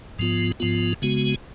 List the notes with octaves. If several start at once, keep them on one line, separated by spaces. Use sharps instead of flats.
G#2 F3 B3 F4
G#2 F3 B3 F4
C#3 G#3 B3 F#4